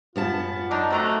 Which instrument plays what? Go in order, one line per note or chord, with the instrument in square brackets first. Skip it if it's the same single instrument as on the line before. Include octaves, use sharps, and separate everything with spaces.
[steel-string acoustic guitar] F#2 B3 A5 [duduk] F4
[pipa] D3 D#4 [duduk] F#3 [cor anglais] D4
[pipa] C3 D#3 A#5 [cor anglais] A3 [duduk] F#4